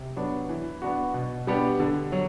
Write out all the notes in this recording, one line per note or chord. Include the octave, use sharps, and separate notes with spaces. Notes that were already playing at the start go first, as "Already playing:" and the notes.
Already playing: C3
F#3 B3 D4
E3
B3 D4 F#4
B2
G3 B3 D4 G4
D3
F#3